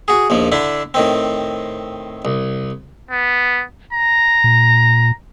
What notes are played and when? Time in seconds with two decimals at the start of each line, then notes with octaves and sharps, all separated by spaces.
0.08 F#4 G#4
0.30 A#1 D#2 F3
0.52 D3 D4 E4
0.94 A2 D#3 C4
2.25 C2
3.11 B3
3.93 A#5
4.44 A#2